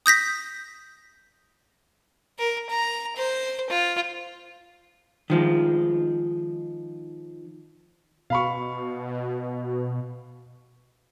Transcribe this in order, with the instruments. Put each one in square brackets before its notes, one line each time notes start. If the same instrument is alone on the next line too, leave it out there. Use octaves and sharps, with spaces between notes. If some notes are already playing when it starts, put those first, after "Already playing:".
[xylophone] D#6 G6 A#6 B6
[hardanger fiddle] A#4
A#5
C5
F4
[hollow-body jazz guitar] D#3 F3 G#3
[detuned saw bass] B2 [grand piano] F5 B5 C#6